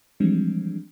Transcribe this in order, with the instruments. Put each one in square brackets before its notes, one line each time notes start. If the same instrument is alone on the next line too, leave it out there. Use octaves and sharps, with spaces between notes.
[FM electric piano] E3 F3 G3 G#3 C4 D4